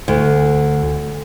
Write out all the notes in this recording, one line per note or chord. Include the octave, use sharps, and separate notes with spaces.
D2